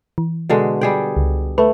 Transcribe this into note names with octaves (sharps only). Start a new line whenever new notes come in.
E3
B2 D3 G#3
G3 G#4 G5
C#2
A3 B4